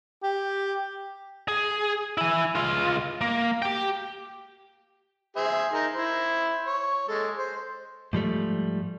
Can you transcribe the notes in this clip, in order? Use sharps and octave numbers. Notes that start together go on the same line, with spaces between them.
G4
G#4
E4 G#5
C#2 F4
A#3
G4 G5
G#4 C5 E5
D#4 A#4
E4 C5
C#5
G#3 A4
C5
G#2 F3 G3 A3